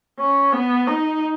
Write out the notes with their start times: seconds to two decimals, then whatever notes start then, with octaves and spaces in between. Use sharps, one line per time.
0.19 C#4
0.53 B3
0.88 D#4